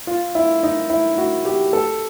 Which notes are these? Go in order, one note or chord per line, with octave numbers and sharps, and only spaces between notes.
F4
E4
D#4
E4
F#4
G4
A4